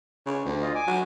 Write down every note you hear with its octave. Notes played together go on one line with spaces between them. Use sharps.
C#3
D2
F4 D#5
G#5 D6
F#3